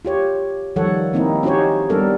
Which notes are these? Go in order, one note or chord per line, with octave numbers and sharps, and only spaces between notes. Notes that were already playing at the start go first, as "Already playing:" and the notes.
F4 G4 C#5
D#3 F3 G3 A4 C#5 F#5
D#3 A#3 C4 D#4 E4
C#4 D#4 F#4 G4 C5 C#5
G3 B3 D4 A4 A#4